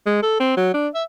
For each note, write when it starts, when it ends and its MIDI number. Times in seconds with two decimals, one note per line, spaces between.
0.06 0.18 56
0.23 0.36 69
0.40 0.56 60
0.57 0.71 54
0.74 0.88 62
0.95 1.03 76